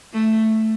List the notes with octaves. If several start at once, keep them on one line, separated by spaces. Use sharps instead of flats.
A3